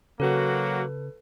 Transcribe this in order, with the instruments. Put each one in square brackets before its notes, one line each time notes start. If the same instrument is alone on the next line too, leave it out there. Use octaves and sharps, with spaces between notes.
[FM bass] C#3 [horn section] F#3 F#4 [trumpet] A#3 [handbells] A4 B4